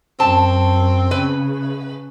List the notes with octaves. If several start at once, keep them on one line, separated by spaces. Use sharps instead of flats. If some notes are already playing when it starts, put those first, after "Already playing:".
F#2 C4 A5
C#3 B4